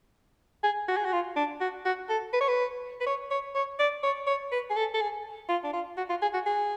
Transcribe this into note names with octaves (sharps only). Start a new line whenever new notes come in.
G#4
F#4
G#4
F#4
F4
D4
F#4
F#4
A4
B4
C#5
B4
B4
C#5
C#5
C#5
D5
C#5
C#5
B4
G#4
A4
A4
G#4
F4
D4
F4
F#4
F4
G#4
F#4
G#4